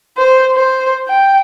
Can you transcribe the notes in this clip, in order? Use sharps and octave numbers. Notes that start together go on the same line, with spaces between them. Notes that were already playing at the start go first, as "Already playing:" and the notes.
C5
C5
G5